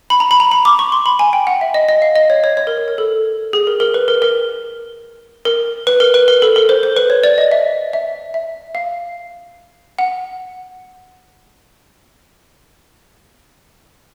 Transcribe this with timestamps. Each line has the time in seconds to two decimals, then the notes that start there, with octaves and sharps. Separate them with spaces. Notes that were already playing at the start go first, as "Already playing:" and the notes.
0.10 B5
0.20 A#5
0.31 B5
0.40 A#5
0.51 B5
0.65 D6
0.79 C#6
0.92 C6
1.06 B5
1.19 G#5
1.33 G5
1.47 F#5
1.61 E5
1.74 D#5
1.89 D#5
2.02 F5
2.16 D#5
2.30 C#5
2.44 C#5
2.57 C#5
2.67 A#4
2.78 A#4
2.88 A#4
2.98 A4
3.53 G#4
3.67 A#4
3.80 A#4
3.94 B4
4.08 A#4
4.22 A#4
5.45 A#4
5.87 B4
6.00 A#4
6.14 B4
6.28 A#4
6.42 A4
6.56 A#4
6.69 C5
6.83 C5
6.97 B4
7.10 C#5
7.24 D5
7.38 D#5
7.52 E5
7.93 E5
8.34 E5
8.75 F5
9.99 F#5